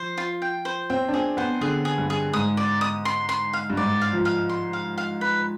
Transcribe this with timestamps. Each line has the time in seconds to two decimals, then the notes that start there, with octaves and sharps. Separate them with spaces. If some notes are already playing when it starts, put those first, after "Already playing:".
Already playing: F3 C5
0.18 F4
0.42 G5
0.65 C5
0.90 C4 G5
1.09 D4
1.13 C4 G#4
1.37 B3 C5
1.61 D3 G#4
1.85 G#4
1.98 G2
2.10 G#4
2.33 G#2 D#6
2.57 D5
2.81 D#6
3.05 C6
3.29 C6
3.53 F5
3.70 G2
3.77 G#2 D5
4.01 F5
4.13 F3
4.25 F5
4.49 C6
4.73 F5
4.98 F5
5.21 B4